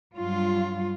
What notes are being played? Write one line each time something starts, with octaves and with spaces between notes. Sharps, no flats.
G2 F#3 F4